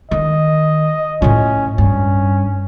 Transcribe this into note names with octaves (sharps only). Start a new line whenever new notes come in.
D#3 D#5
A2 C#4 F4
G2 C#4